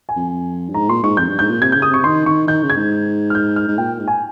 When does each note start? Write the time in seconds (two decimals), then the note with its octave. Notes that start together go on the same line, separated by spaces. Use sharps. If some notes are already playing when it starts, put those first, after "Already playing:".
0.09 G#5
0.16 F2
0.69 G2
0.74 G#2 A#5
0.89 A#2 C6
1.03 G#2 C#6
1.17 F2 G6
1.29 G2
1.39 G#2 G6
1.50 A#2
1.61 C3 G#6
1.72 G6
1.75 C#3
1.82 D#6
1.90 C3 C#6
2.04 D#3 C6
2.26 D#3 C#6
2.47 D#3 G6
2.63 C#3
2.70 G#6
2.76 G#2
3.30 F6
3.35 G6
3.56 F6
3.68 G#2
3.77 A#2 G5
4.00 G#2
4.08 G#5